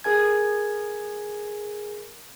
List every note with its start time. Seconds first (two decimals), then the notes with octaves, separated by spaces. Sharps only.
0.04 G#4 A#4 G#5 G#6